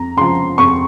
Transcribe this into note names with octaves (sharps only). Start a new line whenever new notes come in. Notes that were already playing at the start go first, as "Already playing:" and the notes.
Already playing: F2 A#5
C#3 F3 C6
F2 C#6